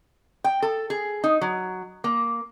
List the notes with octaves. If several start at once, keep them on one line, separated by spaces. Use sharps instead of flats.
G5
A4
G#4
D#4
F#3
A#3